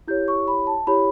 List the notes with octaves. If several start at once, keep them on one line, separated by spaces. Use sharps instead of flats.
E4 G4 C#5 G6
C#6
B5
A5
E4 G4 C#5 B5